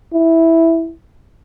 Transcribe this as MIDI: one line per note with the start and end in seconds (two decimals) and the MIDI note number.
0.13 0.92 64